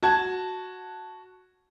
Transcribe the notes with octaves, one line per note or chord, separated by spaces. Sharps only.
F#4 A5 G#6